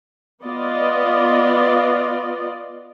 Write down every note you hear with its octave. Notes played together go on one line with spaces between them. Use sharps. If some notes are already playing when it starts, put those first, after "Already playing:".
B3 F4 D5 D#5